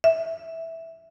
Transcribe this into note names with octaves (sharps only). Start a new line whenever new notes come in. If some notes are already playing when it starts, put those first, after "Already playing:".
E5